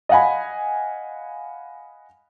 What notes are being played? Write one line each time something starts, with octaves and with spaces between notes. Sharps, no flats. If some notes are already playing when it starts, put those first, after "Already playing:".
D#5 F5 F#5 G#5 B5